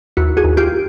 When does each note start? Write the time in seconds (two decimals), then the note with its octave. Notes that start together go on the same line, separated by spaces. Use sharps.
0.17 D#2 E4 F#4
0.37 F#4 G#4
0.44 D#2
0.57 F4 G4